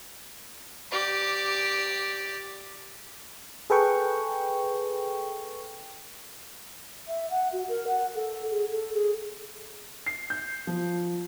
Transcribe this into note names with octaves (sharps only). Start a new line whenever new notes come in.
G4 D5
G#4 A4 B4 G5 C#6
E5
F#5
F#4
A#4
F#5
A4
G#4
A4
G#4
C7
G6
F3